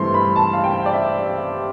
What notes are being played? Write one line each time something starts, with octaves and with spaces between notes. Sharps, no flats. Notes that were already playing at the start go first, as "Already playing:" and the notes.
Already playing: G2 E3 A3 C4 C6
B5
A5
F5
G5
D5
E5